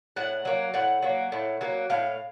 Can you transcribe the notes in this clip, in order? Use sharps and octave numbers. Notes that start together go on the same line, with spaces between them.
A2 F#5
F#3 A#3
A2 F#5
F#3 A#3
A2
F#3 A#3
A2 F5